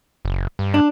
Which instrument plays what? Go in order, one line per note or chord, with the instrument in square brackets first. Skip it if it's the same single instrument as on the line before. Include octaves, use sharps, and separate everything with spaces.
[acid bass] F#1
G2
[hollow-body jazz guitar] D4